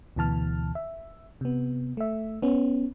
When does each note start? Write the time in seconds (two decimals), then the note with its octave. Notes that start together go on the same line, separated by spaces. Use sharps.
0.16 D2 B2 E3 A5 F6
0.75 E5
1.41 C3 B3
1.97 A3 E5
2.42 B3 C#4